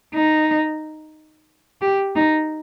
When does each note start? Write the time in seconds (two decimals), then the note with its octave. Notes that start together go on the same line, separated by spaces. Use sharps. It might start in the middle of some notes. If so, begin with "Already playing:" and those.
0.15 D#4
1.81 G4
2.16 D#4